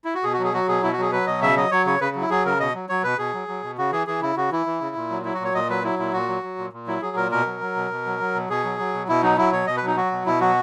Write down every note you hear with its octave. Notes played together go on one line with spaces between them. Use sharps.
E4
F#4
B2 G#4
F#4
F#3
G#4
F#3 F#4
B2 G#4
B2 E4
F#4
F#3 G#4
F#3 B4
B2 D#5
C#3 E5
F#3 D#5
F#3 C#5
C#3 C#5
C#3 B4
F#3
E4
F#3 G#4
C#3 A#4
B2 D#5
F#3
F#3 C#5
B2 B4
B2 G#4
F#3
F#3
B2
C#3 F#4
E3 G#4
E3 G#4
C#3 E4
C#3 F#4
E3 E4
E3
C#3
A#2
F#3
F#3 E4
F#4
A#2 C#5
A#2 D#5
F#3 B4
F#3 E4
A#2 E4
A#2 F#4
F#3
F#3
A#2
A#2
F#3 E4
F#3 G#4
A#2 A#4
B2 A#4
F#3
F#3
B2
B2
F#3
F#3
B2
B2 G#4
F#3
F#3
B2
B2 E4
F#3 D#4
F#3 E4
B2 C#5
B2 D#5
B4
F#3 D#4
F#3 F#4
B2
B2 E4
F#3 F#4